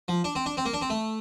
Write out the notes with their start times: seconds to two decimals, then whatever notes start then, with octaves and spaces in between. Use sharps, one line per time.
0.08 F3
0.24 D4
0.35 C4
0.46 D4
0.57 C4
0.65 A#3
0.73 D4
0.82 C4
0.90 A3